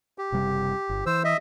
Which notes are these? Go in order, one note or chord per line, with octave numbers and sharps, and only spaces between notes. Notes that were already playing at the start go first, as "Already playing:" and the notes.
G4
F#1 C3 G3
G1
E3 C5 E6
D#5 E5